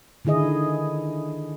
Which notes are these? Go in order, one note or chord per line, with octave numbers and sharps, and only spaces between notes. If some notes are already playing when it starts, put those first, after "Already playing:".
D3 D#3 E4 G#4 D#5